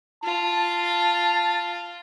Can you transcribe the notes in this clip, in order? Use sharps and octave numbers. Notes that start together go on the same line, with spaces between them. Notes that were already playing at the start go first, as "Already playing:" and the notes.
F4 A5